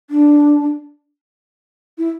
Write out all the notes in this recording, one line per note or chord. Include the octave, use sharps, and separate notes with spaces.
D4
E4